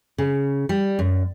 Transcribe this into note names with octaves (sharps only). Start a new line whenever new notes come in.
C#3
G3
F#2